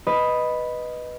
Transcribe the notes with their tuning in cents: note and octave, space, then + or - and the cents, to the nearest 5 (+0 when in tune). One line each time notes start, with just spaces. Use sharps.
B4 +0 D#5 +0